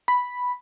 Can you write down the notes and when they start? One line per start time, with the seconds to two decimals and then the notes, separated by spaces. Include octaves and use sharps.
0.08 B5